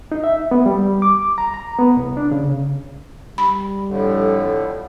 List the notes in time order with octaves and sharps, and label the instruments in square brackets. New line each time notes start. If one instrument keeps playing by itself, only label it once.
[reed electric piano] D#4
E5
B3
G3
D6
A#5
A#5
B3
C2
D4
C#3
[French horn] G3 [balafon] B5
[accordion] F2 A2 D3